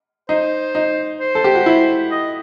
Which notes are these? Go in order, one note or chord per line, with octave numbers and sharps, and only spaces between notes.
D#4 C5
D#4
C5
A4
G4
F#4
E4
D#5